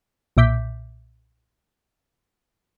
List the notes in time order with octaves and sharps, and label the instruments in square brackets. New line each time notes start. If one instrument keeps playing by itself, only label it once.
[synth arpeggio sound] B1 A#2 E5 D6 G6 B6